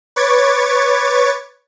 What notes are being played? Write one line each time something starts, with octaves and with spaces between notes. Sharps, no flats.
B4 C#5 C#6 D6 G#6 A6